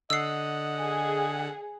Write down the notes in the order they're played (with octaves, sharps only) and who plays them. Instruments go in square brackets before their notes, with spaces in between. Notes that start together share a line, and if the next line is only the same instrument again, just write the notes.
[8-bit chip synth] D3 F#5 [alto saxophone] D#5 [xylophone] E6 C7
[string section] G#4